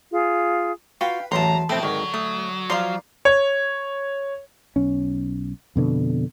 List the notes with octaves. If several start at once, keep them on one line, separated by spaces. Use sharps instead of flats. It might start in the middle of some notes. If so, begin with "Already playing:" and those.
F4 G#4
F4 F#4 B4 F5 G5
A1 E2 F#3 A3 A5 A#5 C6
A#1 B2 A3 C4 E4 G5
G#1 D3 D#3 F#3
A3 D#6
F3 D5 F5 A#5 C6
C#5
B1 C#4
F2 B2 D3